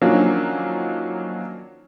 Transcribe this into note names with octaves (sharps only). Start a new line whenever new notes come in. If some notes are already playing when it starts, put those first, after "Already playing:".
D#3 F3 F#3 A#3 C#4 D4